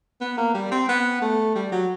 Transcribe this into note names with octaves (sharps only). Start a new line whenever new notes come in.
B3
A#3
G3
C4
B3
A3
G3
F#3